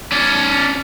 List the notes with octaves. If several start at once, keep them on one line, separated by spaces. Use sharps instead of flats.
C#4 D5